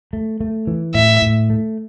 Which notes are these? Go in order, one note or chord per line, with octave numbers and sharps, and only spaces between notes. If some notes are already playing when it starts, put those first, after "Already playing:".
A3
A3
E3
A2 E5
A2
A3